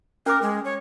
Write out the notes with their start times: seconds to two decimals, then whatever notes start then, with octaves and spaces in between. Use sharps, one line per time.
0.26 C#4 A#4 D6
0.42 G#3
0.65 C#5